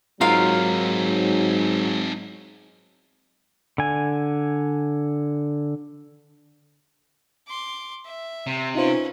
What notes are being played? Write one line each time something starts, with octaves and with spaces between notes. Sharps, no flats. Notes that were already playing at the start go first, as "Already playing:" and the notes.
G#2 F#3 C4 D#4 F4 A#4 F5
D3 G#5
C6 D6
E5
C3
C#4 D#4 F4 B4 C5